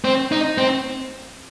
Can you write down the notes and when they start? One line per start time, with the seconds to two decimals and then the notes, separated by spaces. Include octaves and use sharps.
0.05 C4
0.32 D#4
0.58 C4